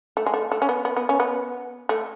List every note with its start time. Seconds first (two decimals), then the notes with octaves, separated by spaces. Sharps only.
0.17 A3
0.26 G#3
0.34 A3
0.52 A3
0.62 C#4
0.69 B3
0.85 B3
0.96 B3
1.09 C#4
1.20 B3
1.89 A3